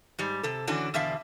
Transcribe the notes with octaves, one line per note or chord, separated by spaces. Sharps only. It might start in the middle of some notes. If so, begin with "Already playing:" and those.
G#2 G3
C3 A4
D3 E3 C#4 D4 F#4
E2 B2 D3 E5 F5 A5